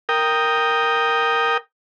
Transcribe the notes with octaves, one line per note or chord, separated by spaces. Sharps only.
A#4 G5 D#6